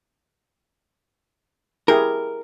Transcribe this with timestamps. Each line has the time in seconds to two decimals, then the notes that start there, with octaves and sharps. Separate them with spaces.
1.88 E4 G4 G#4 A#4